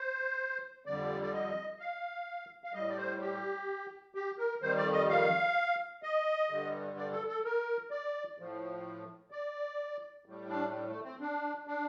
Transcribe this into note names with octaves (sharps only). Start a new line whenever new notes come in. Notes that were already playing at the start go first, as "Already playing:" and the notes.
Already playing: C5
F2 D3 G3 D5
D5
D#5
F5
F5
A2 G3 D#5
D5
C5
G4
G4
A#4
F2 D#3 G3 C5
D5
D#5
F5
D#5
G2 D3 G3
D5
A4
A4
A#4
D5
A2 F3
D5
A2 G3
D4
G3
A3
C4
D4
D4